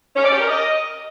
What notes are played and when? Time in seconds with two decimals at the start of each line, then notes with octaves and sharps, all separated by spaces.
0.16 C#4
0.24 D5
0.32 G4
0.40 A#4
0.48 D#5